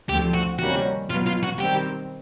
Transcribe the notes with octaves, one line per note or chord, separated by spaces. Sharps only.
D2 D3 F3 A3 C4 G4
F#4
C3 D#3 G3 A#3 C#4 F#4
B2 F#3 B3 F4
F4
F#4
D#3 G3 C4 G4